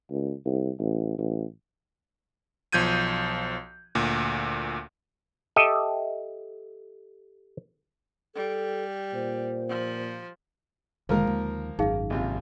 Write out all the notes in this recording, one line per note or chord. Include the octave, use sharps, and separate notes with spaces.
C#2
C2
A1
A1
B1 F3 G6 G#6 D#7
D2 A#2
G4 A4 D#5 E5
G3 A4
A#2 C5
F3
F1 D3 D#3 F3 G#3 A#3 A#4
D#2
G#1 F#2 D#4 G#4 F5
A#1 C3 F4